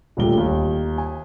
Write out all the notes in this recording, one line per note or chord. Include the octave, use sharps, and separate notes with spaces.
D#1 D2 A#2 G3 G7
D#2
G#5